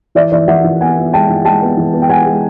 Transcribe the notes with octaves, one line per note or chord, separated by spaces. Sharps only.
E3 D5 E5
E3 D5 E5
E3 E5 F#5
E3
B3 F#5 G#5
B3
G#3 G5 A5
E3
G#3 G5 A5
B3
E3
B3
G5
G#3 F#5 G#5
G#3